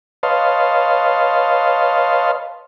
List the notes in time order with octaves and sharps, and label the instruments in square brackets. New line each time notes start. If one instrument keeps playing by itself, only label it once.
[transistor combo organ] B4 C#5 D#5 F5 A5 C6